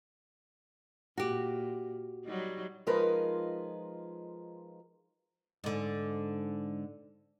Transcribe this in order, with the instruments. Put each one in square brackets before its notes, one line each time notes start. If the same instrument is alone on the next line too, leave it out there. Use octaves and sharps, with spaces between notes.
[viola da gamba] A#2 [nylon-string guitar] F#4 G4
[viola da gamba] F#3 G3 D#4
[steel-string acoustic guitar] F3 G#3 D#4 F4 A#4 B4
[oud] G#2 D3